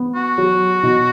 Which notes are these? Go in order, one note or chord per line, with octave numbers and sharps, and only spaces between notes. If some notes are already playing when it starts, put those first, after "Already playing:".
Already playing: B3
F#4
F#3
B2